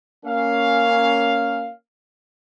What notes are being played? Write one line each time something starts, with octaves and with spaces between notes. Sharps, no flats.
A#3 C#4 F5